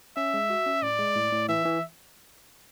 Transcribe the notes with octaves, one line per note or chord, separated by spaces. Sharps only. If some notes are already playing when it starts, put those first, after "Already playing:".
C#4 E5
G#3
F#4
C#4
A2 D5
G#3
A2
A2
E3 E5
E3